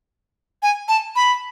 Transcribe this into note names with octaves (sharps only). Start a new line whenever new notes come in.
G#5
A5
B5